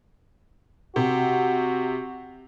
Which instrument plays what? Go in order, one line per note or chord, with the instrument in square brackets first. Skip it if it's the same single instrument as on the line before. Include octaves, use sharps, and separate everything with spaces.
[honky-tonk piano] C3 [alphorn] F#4